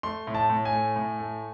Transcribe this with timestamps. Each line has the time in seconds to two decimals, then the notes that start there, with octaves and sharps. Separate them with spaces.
0.03 A3 C6
0.27 A2
0.34 A5
0.50 A2
0.65 G#5
0.73 A3
0.96 A2
1.19 A3